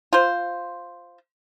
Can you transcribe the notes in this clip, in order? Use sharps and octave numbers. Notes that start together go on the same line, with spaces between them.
F4 C5